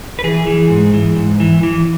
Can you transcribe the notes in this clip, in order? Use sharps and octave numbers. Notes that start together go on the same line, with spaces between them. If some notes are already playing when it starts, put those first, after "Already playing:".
B4
E3 G#4
E3
G#2
E3
G#2
E3
E3